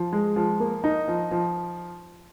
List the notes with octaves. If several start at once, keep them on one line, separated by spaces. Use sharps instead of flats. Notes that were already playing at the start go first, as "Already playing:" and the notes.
Already playing: F3
G#3
F3
A#3
D#4
F3
F3